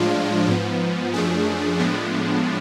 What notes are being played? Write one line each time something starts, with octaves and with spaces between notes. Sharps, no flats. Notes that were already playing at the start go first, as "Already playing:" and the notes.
Already playing: A2 F3 G#3 D4 F4
G#2 F3 B3
F#2 F3 A3 D4 G#4
A2 F3 G#3 B3 D4